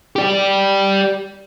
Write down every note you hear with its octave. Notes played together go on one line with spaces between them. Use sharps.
G4 D5